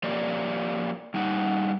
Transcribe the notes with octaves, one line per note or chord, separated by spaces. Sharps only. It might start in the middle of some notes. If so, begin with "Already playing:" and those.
F3 A#3 G4 A#4 C#5 D5
G2 G3 D#4 F#5